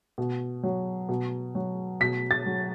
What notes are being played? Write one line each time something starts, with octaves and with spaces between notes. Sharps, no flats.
B2
F#3
B2
F#3
B2 B6
A6
F#3